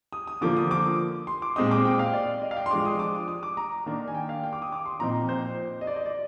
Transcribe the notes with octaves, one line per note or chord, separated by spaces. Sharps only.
D#6
D#6
D3 F3 A#3 D6
D#6
D6
C6
D6
A#2 G#3 C4 D#4 D#6
D6
G5
F5
D5
D#5
F5
G5
C6
F3 G#3 D4 D6
D#6
D6
D#6
D6
A#5
D#3 A#3 D4
G#5
G5
F5
G5
D6
D#6
D6
C6
A#2 F3 C4 D#4 A#5
C5
D#5
D5
D#5
D5